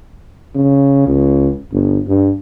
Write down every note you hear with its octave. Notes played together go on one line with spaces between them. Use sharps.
C#3
C#2
G1
G2